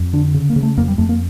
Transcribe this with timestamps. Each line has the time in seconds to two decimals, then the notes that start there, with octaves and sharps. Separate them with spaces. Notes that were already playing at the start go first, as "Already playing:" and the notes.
Already playing: F2
0.13 D3 D4
0.34 C#3
0.50 A#3
0.56 C#3
0.63 A3
0.78 F2 A#3
0.88 G3
0.98 F2 A3
1.09 A#3